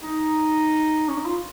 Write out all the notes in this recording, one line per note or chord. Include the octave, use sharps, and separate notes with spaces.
D#4
C#4
D#4
F4